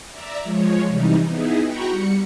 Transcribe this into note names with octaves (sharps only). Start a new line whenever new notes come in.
D5 E5 A#5
F3 G#3 C#5
C3 E3 G3 D#4
B3 D#4 E4 G#4
F#4 G5 A#5 B5 C#6
G3 C#7